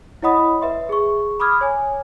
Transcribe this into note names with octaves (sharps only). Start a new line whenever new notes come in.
E4 C#5 D#5 F#5 B5 D#6
B4 E5 C6
G#4 C#6
B5 D6 D#6 F6 G#6
C#5 G#5